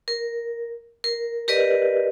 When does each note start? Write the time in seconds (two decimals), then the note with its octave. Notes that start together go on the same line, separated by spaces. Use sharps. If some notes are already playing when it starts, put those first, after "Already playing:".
0.08 A#4
1.04 A#4
1.48 G4 A#4 B4 D5 D#5